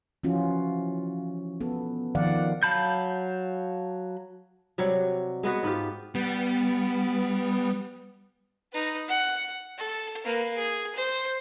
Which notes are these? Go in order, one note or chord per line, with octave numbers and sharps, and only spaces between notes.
E3 F3 C#4 F4 F#4
B3 A4
D#3 F3 D5 F5 F#5
F#3 F5 A5 B5 G6
C3 F#3 G3
G#3 B3 F#4 B4
G#2 B3 F4 G4
G3 B3
D#4 B4
F#5
A4
A#3 B4
G#4
C5